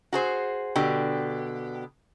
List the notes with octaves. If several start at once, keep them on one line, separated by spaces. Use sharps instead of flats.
F#4 G#4 C5
B2 D3 G4